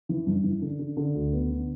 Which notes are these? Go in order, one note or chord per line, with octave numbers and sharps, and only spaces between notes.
E3
G2
E3
D3
D3
D3
D2
B3
D3